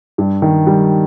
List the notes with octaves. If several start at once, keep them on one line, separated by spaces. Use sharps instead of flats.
G2
D#3
G3